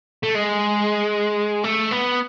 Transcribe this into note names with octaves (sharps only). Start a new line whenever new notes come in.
A3
G#3
A3
B3